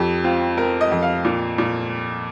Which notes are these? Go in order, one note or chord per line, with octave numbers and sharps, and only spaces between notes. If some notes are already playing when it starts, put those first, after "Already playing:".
Already playing: F2 G4
C4 F4
C4 A#4
D#5
F2
F5
A#2
A#2